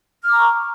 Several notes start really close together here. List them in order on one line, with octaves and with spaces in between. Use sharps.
F6 D6 A#5 C#6